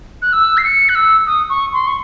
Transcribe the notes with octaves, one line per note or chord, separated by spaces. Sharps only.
F#6
E6
C7
C#7
F#6
E6
D#6
C#6
C6
C#6